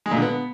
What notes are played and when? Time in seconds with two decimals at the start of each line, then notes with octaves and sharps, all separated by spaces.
0.06 G#3
0.11 A#2
0.16 D3
0.22 B3